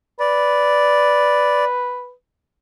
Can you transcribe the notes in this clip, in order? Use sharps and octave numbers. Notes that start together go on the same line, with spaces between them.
B4 D5